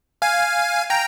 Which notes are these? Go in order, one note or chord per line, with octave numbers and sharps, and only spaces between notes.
F5 G#5
G5 A#5